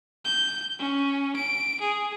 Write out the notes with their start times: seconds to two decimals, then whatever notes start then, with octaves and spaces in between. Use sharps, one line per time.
0.25 G6
0.79 C#4
1.36 D7
1.81 G#4